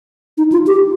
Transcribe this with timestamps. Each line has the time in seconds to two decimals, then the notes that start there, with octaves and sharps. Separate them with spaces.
0.38 D#4
0.52 F4
0.67 G4